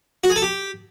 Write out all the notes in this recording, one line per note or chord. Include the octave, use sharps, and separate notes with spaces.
F#4
G#4
A4
G4